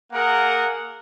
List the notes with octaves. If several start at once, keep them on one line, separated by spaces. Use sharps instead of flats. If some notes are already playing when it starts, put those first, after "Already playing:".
A#3 G#4 A#4 F#5